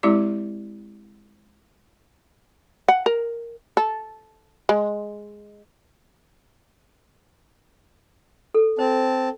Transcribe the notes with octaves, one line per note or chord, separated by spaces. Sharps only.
G#3 C4 E4 G4 D5 D6
F#5
A#4
A4
G#3
A4
C4 C5 A5